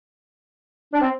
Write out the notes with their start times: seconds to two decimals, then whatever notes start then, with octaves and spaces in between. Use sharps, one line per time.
0.94 D4
1.01 C4